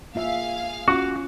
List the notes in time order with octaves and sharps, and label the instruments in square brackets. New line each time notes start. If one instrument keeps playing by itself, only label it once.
[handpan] A#3 F4 E5 [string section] G#4 F5
[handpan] C#4 F4 [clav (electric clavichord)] F#4 [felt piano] C#6